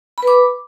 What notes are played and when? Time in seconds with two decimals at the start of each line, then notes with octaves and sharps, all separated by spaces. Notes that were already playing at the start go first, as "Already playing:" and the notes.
0.18 B5
0.23 B4
0.27 D6